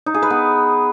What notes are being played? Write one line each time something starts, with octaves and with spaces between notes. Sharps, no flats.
D#4
G#4
B4
B3